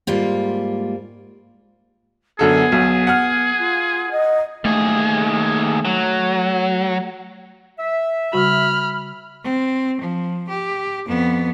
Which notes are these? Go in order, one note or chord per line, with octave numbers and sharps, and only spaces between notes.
G#2 G3 A#3 F4
F#2 D3 B3 G#4 A4
B1
F#5 F6
F4
D#5
D#2 A3 G#4
F#3
E5
C#3 G3 F#4 B5 F6
C4
F3
G4
F2 B3